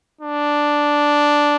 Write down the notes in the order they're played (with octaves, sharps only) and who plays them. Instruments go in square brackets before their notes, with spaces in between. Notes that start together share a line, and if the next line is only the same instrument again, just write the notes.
[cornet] D4